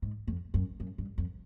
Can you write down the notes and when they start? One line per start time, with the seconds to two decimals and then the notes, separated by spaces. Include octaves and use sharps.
0.02 G#2
0.28 F2
0.54 F#2
0.80 F#2
0.98 G2
1.18 F2